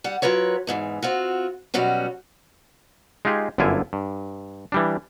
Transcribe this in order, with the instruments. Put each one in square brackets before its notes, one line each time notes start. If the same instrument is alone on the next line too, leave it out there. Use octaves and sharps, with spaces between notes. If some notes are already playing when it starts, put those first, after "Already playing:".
[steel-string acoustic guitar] G3 F#5
F#3 F4 A#4 B4 C#5
E2 G#2 E3
C4 F4 F#4
B2 F#3 G3 C#4 F#4
[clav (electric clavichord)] G#3 D#4 F4 G4 G#4
G1 F#2 D3 E4 F4 G#5
G2
E3 G3 D4